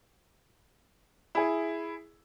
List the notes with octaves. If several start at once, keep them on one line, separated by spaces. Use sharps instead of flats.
E4 G#4